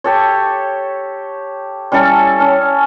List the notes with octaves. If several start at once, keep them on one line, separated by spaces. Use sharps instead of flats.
G4 A4 C#5
G3 C#4 E4 A4
C#4